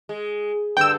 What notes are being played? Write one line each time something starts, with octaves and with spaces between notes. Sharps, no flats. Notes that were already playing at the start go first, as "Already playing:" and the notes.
G#3
G2 D3 G5 E6